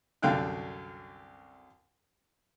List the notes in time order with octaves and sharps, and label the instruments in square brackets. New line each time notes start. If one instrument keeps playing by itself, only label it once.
[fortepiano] C2 F#2 D3 F5 G5 F#6